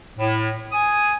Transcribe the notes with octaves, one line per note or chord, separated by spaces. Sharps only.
A2
G#5 D#6